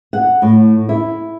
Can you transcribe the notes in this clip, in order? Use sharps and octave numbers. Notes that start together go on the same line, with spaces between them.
F#5
A2
E4